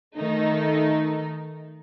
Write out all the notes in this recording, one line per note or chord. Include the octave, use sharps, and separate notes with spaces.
D#3 A3 D#4